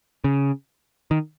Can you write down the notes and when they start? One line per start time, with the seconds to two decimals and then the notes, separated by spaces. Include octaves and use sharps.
0.24 C#3
1.11 D#3